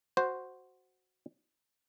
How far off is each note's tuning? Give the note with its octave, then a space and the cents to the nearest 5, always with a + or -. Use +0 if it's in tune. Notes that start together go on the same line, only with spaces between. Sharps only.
F#4 +0 C5 +0